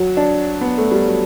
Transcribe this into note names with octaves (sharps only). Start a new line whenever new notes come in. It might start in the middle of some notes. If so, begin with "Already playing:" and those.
Already playing: F#3
D4
B3
A3
G3
F#3